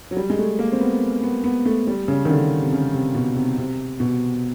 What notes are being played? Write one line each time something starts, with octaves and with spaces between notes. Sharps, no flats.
F#3
G3
G#3
A3
A#3
C4
B3
B3
B3
A3
G3
C#3
D#3
D3
C3
C#3
C3
B2
C3
C3
B2